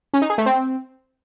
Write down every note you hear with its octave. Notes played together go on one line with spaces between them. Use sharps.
C#4
D#4
G#4
A3
C4